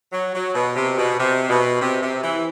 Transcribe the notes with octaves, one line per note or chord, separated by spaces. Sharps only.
F#3
F#3
B2
C3
B2
C3
B2
C3
C3
E3